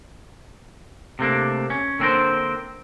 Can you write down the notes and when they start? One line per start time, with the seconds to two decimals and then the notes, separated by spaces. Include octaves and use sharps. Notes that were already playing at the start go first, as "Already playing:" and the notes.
1.19 C3 A3 A#3 D4
1.70 C#4
1.99 D3 A#3 C4 D4 A#4 C5